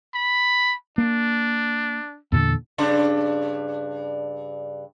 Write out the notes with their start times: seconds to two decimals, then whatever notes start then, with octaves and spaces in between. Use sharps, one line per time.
0.14 B5
0.98 A#3 D4
2.32 E2 A#2 D3 A4
2.78 G2 C#3 D4